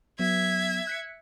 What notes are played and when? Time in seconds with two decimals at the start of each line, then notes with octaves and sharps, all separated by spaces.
0.19 F#3 B3 E5 G#6
0.87 F#6 B6 C#7